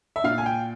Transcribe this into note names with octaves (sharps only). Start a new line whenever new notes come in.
E5
A#2 F5
G#5
G5